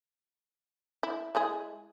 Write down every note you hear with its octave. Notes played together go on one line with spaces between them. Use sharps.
E4
G#3 E4 G#4